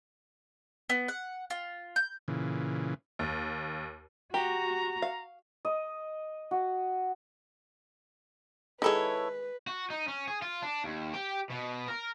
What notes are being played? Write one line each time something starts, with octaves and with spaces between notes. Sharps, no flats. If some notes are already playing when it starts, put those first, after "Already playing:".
B3
F#5
F4
G6
A#2 C#3 E3
D#2
F#4 G4 A#5
F5
D#5
F#4
D#3 G#3 E4 A4 B4 C#5
F#4
D#4
C#4
G#4
F4
D4
D#2
G4
B2
A#4